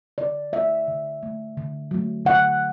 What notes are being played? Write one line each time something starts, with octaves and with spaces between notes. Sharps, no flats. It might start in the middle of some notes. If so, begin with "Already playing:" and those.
D3 D5
A3 E5
D3
A3
D3
F#3 A3
D3 F#5